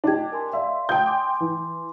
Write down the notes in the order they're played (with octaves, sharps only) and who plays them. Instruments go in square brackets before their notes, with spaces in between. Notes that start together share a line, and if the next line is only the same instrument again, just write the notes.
[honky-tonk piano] D4 G4 [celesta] D#5 G#6
[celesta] A#4 G#5 C6
[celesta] D5 F5 C6 [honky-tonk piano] E5
[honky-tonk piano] G5 D#6 G6
[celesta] G#5 C6 D6
[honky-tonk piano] E3